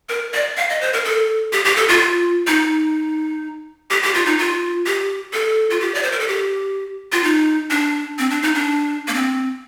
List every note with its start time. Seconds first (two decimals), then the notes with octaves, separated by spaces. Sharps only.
0.09 A#4
0.34 D5
0.57 F5
0.70 D#5
0.81 C5
0.93 A#4
1.05 A4
1.53 G4
1.65 G4
1.76 A4
1.89 F4
2.47 D#4
3.91 G4
4.03 G4
4.14 F4
4.26 D#4
4.39 F4
4.86 G4
5.33 A4
5.70 F4
5.80 G4
5.95 D5
6.03 C5
6.12 A#4
6.19 A4
6.28 G4
7.12 F4
7.24 D#4
7.70 D4
8.18 C4
8.30 D4
8.43 D#4
8.55 D4
9.08 A#3
9.14 C4